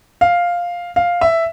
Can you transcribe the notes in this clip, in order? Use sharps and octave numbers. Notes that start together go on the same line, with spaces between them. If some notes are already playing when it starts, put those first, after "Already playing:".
F5
F5
E5